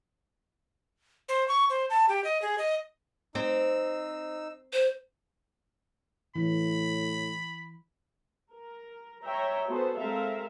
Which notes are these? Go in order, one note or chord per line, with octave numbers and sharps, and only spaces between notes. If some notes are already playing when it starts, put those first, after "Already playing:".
C5
C#6
C5
A5
G4
D#5
G#4
D#5
C4 D#4 E6
C5
A2 E3 E4 B5
A#4
C#5 E5 G5 A#5
B3 F#4 G#4 A4 C5
G#3 C4 A4 A#4 E5 F5